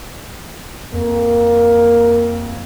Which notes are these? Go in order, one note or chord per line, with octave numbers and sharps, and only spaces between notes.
F2 A#3